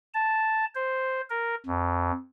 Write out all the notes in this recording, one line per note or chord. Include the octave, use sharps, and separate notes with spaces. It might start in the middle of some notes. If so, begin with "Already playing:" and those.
A5
C5
A#4
F2